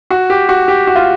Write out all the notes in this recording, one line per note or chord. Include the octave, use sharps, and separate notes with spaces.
F#4
G4
F#4
G4
F#4
F4